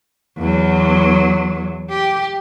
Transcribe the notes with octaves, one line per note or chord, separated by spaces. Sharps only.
E2 F#3
G4